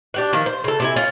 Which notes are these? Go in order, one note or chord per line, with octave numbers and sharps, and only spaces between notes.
D4 G4 F#5
D#3 F3
C5
C#3 A4
C3 E4 G#5
C#4 F4